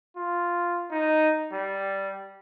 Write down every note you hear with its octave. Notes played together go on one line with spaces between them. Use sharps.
F4
D#4
G3